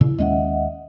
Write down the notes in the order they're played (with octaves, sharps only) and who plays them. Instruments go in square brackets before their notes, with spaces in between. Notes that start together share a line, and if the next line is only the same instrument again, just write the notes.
[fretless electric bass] A#2 C#3 [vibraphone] E4
[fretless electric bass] D#2 G#3 C#4 [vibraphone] D#5 E5 F#5